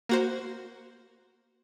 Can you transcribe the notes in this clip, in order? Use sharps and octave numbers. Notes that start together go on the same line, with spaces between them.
A#3 F#4 C5